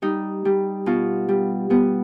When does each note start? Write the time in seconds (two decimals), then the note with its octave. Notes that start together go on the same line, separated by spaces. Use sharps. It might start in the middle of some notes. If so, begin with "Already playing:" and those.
0.02 G3 D#4
0.45 G3
0.86 B2 F4
1.29 G3
1.70 G3 B3